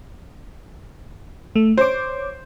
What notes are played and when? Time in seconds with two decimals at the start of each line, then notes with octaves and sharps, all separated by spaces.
1.56 A3
1.78 C5 C#5 D6